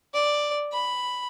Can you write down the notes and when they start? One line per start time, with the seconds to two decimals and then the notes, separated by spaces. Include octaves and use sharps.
0.14 D5
0.72 B5